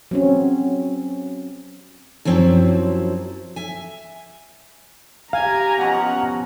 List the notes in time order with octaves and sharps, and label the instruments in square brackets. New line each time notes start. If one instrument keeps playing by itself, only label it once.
[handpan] F#3 C4 C#4
[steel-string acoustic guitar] F#2 F3 F#3 C4 E4
E5 G#5
[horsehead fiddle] G4 A#5 [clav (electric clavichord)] F5 [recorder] G#5
[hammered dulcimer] B2 F3 C#4 [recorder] F#5